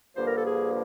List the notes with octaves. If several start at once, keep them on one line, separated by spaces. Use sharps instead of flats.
G2 D3 F3 A#3 C5
A#4
A4
G#4